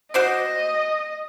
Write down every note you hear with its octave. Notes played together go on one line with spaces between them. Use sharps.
F#4 C5 D5 D#5